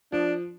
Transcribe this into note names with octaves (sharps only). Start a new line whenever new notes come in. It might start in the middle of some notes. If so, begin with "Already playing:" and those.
F3 D4